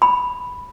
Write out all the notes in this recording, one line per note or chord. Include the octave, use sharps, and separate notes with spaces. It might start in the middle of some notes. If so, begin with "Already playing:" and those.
B5